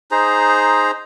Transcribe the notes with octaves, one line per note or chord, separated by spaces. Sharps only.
D#4 G#4 C5 A#5